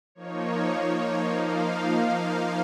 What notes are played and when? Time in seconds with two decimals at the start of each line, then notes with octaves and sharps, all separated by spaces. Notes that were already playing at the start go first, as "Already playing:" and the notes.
0.15 F3 A#3 D#4 C#5
1.29 F3 A#3 D#4 F5